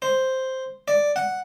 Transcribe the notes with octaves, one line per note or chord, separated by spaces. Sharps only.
C5
D5
F#5